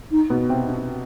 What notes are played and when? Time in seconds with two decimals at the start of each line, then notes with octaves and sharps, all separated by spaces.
0.11 D#4
0.30 B2 B3
0.49 C3 C4
0.67 D4